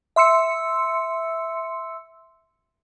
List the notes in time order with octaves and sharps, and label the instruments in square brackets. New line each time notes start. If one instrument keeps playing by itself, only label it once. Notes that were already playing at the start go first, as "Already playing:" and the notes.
[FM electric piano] E5 C6 E6 C#7